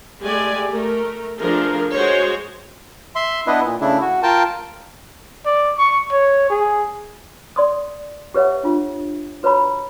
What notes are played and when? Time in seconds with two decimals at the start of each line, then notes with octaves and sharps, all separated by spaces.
0.23 G#3 A3 G4 D5 G#5
0.70 A3 A#4
1.39 F3 A3 D4 F4 G#4 A#4
1.93 G#3 F#4 C5 C#5
3.16 E5 C6
3.47 B3 D4 E4 B4 D#5
3.64 A#2
3.81 C#3 A3 D4 E4
4.01 F#4
4.23 F4 A#4 G5 A5
5.46 D5
5.78 C#6
6.12 C#5
6.50 G#4
7.56 D5 C6 D#6
8.34 G4 B4 C#5 E5 F#5
8.63 D4 F4
9.43 F#4 B4 C#5 A#5 B5